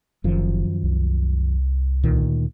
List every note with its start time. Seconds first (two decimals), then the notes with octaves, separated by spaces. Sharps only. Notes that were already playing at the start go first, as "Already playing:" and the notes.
0.24 F#1 F#2 D#3 F3
0.83 C2
2.03 D2 A#2 D#3